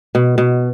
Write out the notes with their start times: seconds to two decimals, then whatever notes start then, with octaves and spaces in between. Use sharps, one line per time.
0.15 B2
0.38 B2